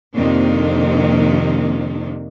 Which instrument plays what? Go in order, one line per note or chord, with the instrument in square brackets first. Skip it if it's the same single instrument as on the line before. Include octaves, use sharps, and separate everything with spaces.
[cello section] F2 C3 D#3 A#3 C4 D4